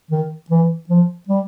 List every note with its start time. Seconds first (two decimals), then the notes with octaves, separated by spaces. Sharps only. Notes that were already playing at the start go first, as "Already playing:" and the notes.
0.11 D#3
0.50 E3
0.89 F3
1.28 G3